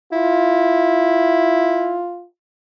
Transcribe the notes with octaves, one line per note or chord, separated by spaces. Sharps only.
E4 F4